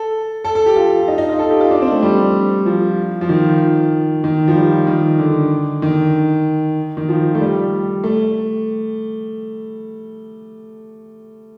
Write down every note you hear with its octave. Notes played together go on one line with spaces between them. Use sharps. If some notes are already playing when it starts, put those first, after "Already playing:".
Already playing: A4
A4
A4
G4
F4
D#4
D#4
F4
A4
G4
F4
D4
C4
A3
G3
F3
F3
D#3
D#3
F3
G3
D#3
D3
D#3
D#3
F3
A3
G3
A3